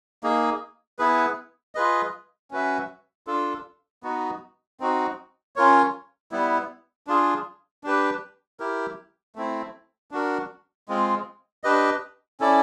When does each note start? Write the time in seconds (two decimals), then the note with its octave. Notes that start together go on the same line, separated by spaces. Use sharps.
0.23 A#3 D#4 G#4
0.99 B3 E4 G#4 B4
1.75 F4 G#4 B4 D#5
2.51 C#4 F#4 B4 E5
3.27 D4 F4 A4
4.03 B3 D#4 F#4
4.80 C4 D#4 F#4
5.56 C#4 F4 A#4 C#5
6.32 G3 B3 E4
7.07 D4 F4 G#4
7.84 D4 G4 B4
8.60 E4 G4 A#4
9.36 A3 C4 E4
10.11 D4 F#4 A#4
10.89 G#3 C4 F4
11.64 D4 G4 B4 D#5
12.40 C#4 E4 A4 D5